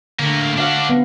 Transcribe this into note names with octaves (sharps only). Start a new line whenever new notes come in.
A2 D3 A#3
D4 F#4 F5 F#5
B3 C4